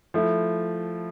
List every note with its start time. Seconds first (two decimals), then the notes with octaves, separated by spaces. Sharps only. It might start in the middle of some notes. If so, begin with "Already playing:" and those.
0.14 F3 A3 E4